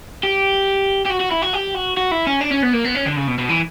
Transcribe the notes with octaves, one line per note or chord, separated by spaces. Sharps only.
G4
G4
F#4
F#4
E4
F#4
G4
F#4
F#4
E4
C#4
D4
C#4
B3
A#3
B3
C#4
D3
C#3
B2
B2
E3